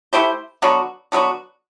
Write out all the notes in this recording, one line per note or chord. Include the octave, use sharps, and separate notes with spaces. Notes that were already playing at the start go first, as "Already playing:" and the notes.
A3 E4 G4 C5
D3 F#3 B3 F#4
D3 F#3 B3 F#4